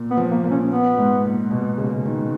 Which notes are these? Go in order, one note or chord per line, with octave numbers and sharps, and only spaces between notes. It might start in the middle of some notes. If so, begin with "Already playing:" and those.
Already playing: A#2
B3
F3
A#3
A#2
C#4
B3
G#2
A#2
B2
C#3
D#3